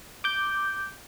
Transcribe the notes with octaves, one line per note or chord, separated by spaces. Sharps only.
D6 G6